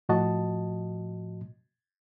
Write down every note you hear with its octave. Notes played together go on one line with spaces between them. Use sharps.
A2 F3 F#4 D#5 A5